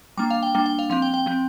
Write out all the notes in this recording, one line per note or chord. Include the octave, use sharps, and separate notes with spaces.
G3 A#3 D4 D6
F5
G5
G3 A#3 D4 G5
G5
F5
F3 C4 F5
G5
G5
F3 C4